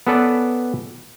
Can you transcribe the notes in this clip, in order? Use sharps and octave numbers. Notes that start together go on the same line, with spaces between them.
B3 C#4 A4 B4 D5